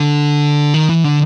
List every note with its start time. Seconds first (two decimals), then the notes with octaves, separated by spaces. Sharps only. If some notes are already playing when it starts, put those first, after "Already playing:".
Already playing: D3
0.74 D#3
0.89 E3
1.04 D3